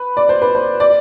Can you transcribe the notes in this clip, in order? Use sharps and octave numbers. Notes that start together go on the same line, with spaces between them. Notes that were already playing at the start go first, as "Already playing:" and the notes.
Already playing: B4
D5
C5
B4
C5
D5